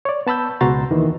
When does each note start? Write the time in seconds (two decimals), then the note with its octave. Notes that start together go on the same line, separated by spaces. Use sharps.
0.05 C#5 D5
0.27 B3 A5 B5 E6 G6
0.61 C#2 B2 F#4 A#5 C6 A6
0.91 D#2 D#3 E3